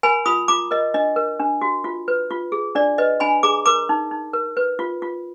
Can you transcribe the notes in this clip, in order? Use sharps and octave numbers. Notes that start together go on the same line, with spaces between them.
A#4 G#5 B5
F4 B5 D#6
F4 A#5 D6
A#4 D#5
D4 D#5
A#4
D4
F#4
F4
B4
F4
G#4
D4 D5
B4 D#5
D4 G#5 B5
G#4 A#5 D6
A#4 A#5 D6
D#4
D#4
A#4
B4
F4
F4